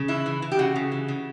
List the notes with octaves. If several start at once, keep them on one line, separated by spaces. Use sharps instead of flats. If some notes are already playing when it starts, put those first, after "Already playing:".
Already playing: C#3
E3 E4
E3
E3
G4
C#3 F#4
C#3
E3
C#3